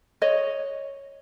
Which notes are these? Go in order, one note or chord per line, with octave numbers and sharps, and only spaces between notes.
C#5 D#5